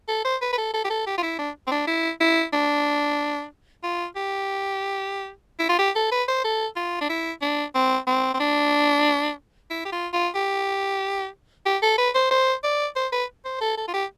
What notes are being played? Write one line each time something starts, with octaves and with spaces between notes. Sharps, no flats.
A4
C5
B4
B4
A4
A4
G4
A4
G4
F4
E4
D4
C4
D4
E4
E4
D4
F4
G4
E4
F4
G4
A4
B4
C5
A4
F4
D4
E4
D4
C4
C4
C4
D4
E4
G4
F4
F4
G4
G4
A4
B4
C5
C5
D5
C5
B4
C5
A4
A4
F4
G4